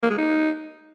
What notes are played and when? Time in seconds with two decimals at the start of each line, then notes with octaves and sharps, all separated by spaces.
0.03 A#3
0.10 G#3
0.18 D#4